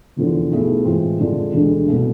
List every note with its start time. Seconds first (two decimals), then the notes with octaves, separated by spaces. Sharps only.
0.16 F1 E2 D3 F3
0.50 B1 B2 A3 E4 G#4
0.84 A2 E3 G#3 C4 F4
1.19 F2 D3 G#3 D4 F4
1.54 E1 D2 D3 G#3
1.88 C2 B2 A3